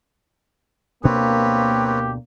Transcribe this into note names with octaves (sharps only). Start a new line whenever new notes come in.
D2 B2 A#3 C4 D4 G4 B4 C#5
G4